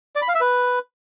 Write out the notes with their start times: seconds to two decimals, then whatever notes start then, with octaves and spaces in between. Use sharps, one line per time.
0.16 D5
0.22 B5
0.28 F5
0.34 E5
0.41 B4